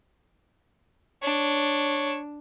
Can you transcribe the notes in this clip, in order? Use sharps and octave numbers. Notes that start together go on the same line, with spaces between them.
D4 C#5